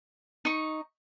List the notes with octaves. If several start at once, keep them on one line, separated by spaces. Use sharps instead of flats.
D#4 C#6